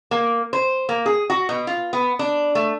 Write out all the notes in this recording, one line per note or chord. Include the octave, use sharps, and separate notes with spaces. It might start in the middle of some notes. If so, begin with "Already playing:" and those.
A#3
C5
A#3
G#4
F#4
B2
F4
B3
D4
A3